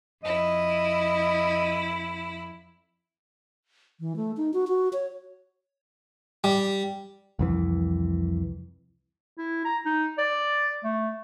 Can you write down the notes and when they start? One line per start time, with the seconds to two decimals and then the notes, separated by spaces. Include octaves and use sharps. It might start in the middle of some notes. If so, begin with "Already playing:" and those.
0.24 F2 E4 D#5
4.00 E3
4.16 A3
4.37 D#4
4.53 F#4
4.67 F#4
4.93 C#5
6.44 G3
7.39 C2 F2 E3
9.38 E4
9.65 A#5
9.85 D#4
10.18 D5
10.84 A3